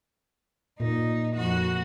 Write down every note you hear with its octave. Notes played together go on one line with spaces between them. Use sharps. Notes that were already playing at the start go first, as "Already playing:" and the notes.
A#2 D#4
F2 F#4